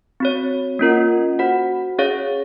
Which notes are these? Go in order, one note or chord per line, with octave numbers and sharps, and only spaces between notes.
C4 F#4 C#5
A#3 C#4 F4 A#4 D#5
F#4 C5 F#5
C#4 G#4 C#5 F5